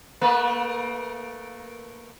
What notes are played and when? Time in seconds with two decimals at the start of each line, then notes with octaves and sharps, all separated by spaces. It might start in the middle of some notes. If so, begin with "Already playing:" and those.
0.21 A3 A#3 B4